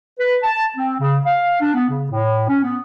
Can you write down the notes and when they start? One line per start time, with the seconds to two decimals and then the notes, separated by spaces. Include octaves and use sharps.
0.19 B4
0.43 A5
0.77 C4
0.99 C#3
1.25 F5
1.61 D4
1.75 B3
1.89 C#3
2.10 A2
2.48 C#4
2.63 B3